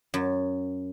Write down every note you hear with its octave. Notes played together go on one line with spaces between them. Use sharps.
F#2